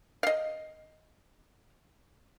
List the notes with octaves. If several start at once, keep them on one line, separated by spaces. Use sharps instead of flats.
D#5 F5